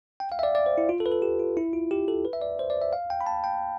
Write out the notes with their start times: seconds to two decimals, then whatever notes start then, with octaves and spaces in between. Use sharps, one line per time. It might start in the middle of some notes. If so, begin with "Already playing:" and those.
0.20 G5
0.32 F5
0.39 E5
0.43 D5
0.55 D5
0.66 C5
0.78 E4
0.89 F4
1.00 A4
1.06 B4
1.12 A4
1.22 G4
1.40 F4
1.57 E4
1.73 F4
1.91 G4
2.08 A4
2.25 B4
2.33 E5
2.42 D5
2.59 C5
2.70 D5
2.81 E5
2.93 F5
3.10 G5
3.21 B5
3.26 A5
3.44 G5